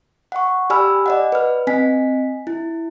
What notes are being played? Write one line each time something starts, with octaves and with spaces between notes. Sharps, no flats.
F#5 C#6
G4 D5 G#5 B5 E6 F6
D5 D#5 F#5
B4 F6
C4 D#5 G#5 B6
E4